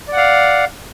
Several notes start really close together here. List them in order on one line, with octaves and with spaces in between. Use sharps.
D5 F#5 F5